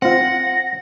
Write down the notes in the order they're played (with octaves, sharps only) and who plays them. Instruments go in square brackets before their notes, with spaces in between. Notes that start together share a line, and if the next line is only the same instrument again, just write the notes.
[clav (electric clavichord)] C4 F4 [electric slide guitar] F#5 [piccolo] A#6